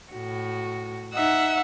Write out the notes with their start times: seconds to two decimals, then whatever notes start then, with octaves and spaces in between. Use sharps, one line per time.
0.12 A2 F#4
1.14 D#4 E5 F#5 E6